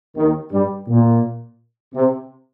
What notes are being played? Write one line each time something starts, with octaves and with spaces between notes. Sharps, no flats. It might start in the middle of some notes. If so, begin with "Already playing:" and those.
D#2 D#3
G2 G3
A#2
C3